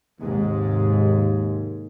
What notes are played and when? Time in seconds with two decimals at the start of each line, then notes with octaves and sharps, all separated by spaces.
0.20 D#2 G#2 C3 G#3